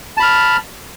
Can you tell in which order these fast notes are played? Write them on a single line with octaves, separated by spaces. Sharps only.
A5 B5 F6